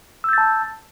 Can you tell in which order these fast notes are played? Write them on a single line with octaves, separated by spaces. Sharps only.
E6 G6 A6 A5